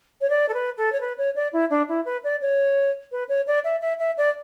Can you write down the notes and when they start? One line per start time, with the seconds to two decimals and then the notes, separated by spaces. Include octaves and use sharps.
0.21 C#5
0.29 D5
0.48 A4
0.53 B4
0.77 A4
0.92 C#5
1.00 B4
1.17 C#5
1.35 D5
1.52 E4
1.70 D4
1.88 E4
2.05 B4
2.23 D5
2.41 C#5
3.11 B4
3.28 C#5
3.47 D5
3.64 E5
3.81 E5
3.99 E5
4.17 D5